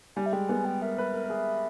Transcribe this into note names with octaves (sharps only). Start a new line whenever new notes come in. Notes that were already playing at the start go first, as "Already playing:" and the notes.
G3 G#5
E5
G#3 G5
B3 G#5
G#4 G5
A#4 E5
B4
A#4
A#4
G#4